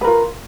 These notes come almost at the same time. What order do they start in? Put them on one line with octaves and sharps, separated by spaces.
B4 A#4 F4